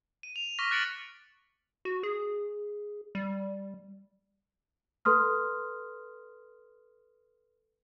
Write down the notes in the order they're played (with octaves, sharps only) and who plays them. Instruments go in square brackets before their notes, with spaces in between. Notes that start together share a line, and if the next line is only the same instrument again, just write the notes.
[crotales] D#7
F7
C#6 D6 F6 A#6 B6 F7
F#6 A6 C#7 D7 F#7
[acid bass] F#4
G#4
G3
[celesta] A4 B4 C6 D#6 F6